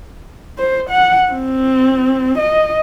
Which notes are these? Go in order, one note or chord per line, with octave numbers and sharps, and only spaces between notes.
C5
F#5
C4
D#5